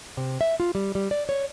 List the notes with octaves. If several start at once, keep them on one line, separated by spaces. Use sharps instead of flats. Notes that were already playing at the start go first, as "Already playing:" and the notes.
C3
E5
F4
G3
G3
D5
C#5